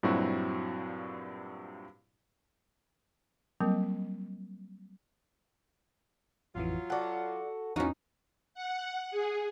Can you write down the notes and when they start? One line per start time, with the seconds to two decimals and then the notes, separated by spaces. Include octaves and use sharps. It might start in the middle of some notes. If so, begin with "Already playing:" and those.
0.03 G2 A#2 F#3 C4 E4 F#4
3.60 F#3 G3 A#3 C4 A#4
6.55 A1 F2 E3 F#3 F4
6.90 F#4 A4 D5 F#5
7.76 E2 A#2 E3 A#3 C#4 D#4 F#4
8.54 F#5
9.11 G#4